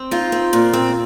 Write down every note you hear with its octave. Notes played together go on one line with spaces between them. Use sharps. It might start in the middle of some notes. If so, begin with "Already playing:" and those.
Already playing: C4
D#4 F4
C4
A#2
C4